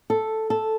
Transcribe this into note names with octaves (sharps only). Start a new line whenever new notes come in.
A4
A4